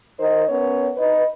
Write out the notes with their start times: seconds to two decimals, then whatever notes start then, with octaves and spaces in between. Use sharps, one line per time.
0.18 D#3 D#4 A#4 C5
0.48 B3 C#4 A#4 C#5
0.96 D#4 B4